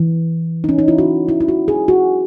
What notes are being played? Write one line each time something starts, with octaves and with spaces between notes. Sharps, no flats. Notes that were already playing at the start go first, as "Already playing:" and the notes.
Already playing: E3
D#4
C#4
D#4
E4
F#4
E4
E4
F#4
G#4
F#4